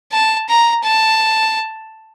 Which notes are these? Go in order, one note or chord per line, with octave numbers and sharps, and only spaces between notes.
A5
A#5
A5